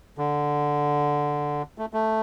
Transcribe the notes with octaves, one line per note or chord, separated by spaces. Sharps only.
D3
A3
A3